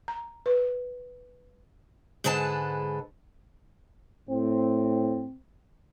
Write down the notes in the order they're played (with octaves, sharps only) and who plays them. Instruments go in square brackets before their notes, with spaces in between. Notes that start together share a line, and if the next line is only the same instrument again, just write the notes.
[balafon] A#5
B4
[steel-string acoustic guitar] G#2 D3 G#3 A4 B4 A5
[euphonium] A2 [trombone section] C4